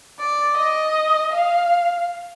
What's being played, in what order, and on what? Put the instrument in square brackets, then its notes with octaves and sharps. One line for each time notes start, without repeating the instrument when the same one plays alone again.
[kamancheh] D5
D#5
F5